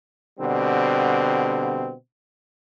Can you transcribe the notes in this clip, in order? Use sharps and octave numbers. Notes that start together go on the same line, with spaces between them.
B2 D3 G3 C4